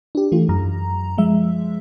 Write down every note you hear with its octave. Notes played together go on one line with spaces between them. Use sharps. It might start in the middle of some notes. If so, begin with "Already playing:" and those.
D4 G4
E3 A3 F4
F#2 A#5
F3 G#3 E5